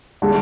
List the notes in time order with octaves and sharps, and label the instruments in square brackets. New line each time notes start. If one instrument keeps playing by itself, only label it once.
[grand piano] D3 G#3